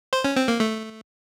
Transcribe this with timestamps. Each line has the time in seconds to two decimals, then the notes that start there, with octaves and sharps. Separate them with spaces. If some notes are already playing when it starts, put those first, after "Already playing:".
0.13 C5
0.24 C#4
0.36 C4
0.48 A#3
0.60 A3